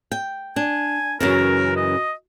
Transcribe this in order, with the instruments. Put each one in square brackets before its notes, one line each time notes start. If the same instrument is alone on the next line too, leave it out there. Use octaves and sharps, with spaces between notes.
[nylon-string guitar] G5
[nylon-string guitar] D4 [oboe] G#5
[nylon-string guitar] F#2 C#3 E3 [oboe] A#4
[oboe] D#5